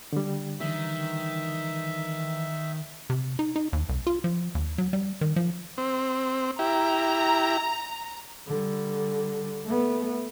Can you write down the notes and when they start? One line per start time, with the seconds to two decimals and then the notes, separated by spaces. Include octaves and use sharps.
0.12 D3 G3
0.60 D#3 E3 E5
3.10 C3
3.39 D#4
3.56 D#4
3.73 D#2
3.89 C2
4.07 F4
4.24 F3
4.55 D#2
4.78 F#3
4.93 G3
5.21 D#3
5.36 F3
5.78 C4
6.59 E4 G4 A#5
8.47 D3 G3
9.65 A3 B3